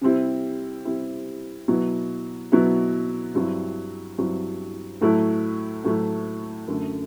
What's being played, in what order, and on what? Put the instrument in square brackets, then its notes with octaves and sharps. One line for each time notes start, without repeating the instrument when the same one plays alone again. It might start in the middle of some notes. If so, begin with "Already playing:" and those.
[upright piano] C3 G3 C4 E4
C3 G3 C4 E4
B2 F#3 B3 E4
B2 F#3 B3 E4
G2 F#3 C4 E4
G2 F#3 C4 E4
A2 F#3 A3 E4
A2 F#3 A3 E4
F#2 D3 A3